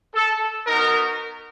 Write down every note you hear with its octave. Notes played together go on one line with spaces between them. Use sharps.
A4
B3 D#4 F#4 A#4